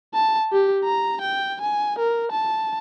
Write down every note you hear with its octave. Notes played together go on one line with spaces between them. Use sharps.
A5
G4
A#5
G5
G#5
A#4
A5